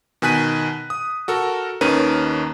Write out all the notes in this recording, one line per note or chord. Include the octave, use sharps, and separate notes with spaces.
B2 D#3 G#5 F#6 B6 D#7
D#6
F#4 A4 A#4
D#2 D#3 C#4 A#4 B4 D#7